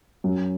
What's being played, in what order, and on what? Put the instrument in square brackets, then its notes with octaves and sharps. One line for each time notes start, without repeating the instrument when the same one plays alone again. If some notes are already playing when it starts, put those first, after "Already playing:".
[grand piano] F#2 F#3